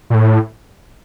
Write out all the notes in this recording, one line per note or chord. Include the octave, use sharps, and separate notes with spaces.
A#2
A2